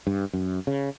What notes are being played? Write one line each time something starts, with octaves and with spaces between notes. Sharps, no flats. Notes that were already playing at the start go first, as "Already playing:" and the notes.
G2
F#2
C#3